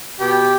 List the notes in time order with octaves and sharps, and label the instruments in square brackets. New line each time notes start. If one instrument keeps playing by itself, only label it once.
[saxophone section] B2 G4